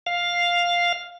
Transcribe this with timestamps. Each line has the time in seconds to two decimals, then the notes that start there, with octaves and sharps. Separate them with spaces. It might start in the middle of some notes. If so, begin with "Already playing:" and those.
0.06 F5